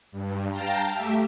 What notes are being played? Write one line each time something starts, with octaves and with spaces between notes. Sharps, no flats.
G2
F5 G5 A5 A#5
A3 G4 E5